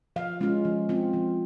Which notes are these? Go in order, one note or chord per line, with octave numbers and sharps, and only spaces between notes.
F3 F5
G#3 C#4 F4
F3
C4 F4
F3